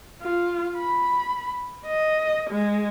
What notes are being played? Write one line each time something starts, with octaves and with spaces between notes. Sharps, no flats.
F4
B5
D#5
G#3